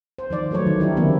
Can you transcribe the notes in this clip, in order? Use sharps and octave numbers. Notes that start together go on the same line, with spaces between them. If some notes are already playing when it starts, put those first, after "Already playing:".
C5
D#3 F3 D5
F3 F#3 A3 B4 C#5
D#3 E3
D4 E4 G4 A#4
D3 E3 F#3 A#3 C4 E4